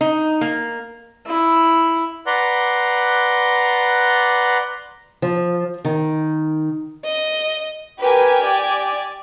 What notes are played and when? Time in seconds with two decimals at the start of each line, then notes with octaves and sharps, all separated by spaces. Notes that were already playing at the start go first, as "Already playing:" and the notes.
0.01 D#4
0.41 A#3
1.26 E4
2.26 B4 D5 F#5 A#5 C6
5.22 F3
5.85 D#3
7.04 D#5
8.00 G4 A#4 B4 G#5
8.40 D5